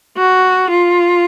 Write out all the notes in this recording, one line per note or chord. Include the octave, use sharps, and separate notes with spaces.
F#4
F4